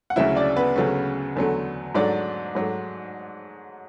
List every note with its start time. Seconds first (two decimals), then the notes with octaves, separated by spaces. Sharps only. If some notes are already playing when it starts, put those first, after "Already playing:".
0.10 F#5
0.16 D2 C#3 F#3 E4 E5
0.36 D4 D5
0.56 B3 B4
0.76 D2 C#3 F#3 A3
1.36 E2 D3 F#3 A3
1.95 G#2 F#3 A3 D4 D5
2.55 G#2 F#3 A3